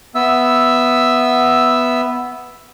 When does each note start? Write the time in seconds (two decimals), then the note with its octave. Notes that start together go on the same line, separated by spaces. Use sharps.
0.15 B3 E5 E6